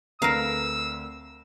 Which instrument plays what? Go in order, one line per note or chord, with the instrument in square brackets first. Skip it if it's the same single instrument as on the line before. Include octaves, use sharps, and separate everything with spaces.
[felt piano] D2 A3 C4 [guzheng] A#4 F5 [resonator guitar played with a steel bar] B4 A#5 [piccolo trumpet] E6